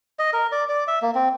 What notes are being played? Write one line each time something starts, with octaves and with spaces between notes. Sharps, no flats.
D#5
A#4
D5
D5
E5
A#3
C4